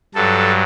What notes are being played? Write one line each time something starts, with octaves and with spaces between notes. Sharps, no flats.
G2 F#3 A4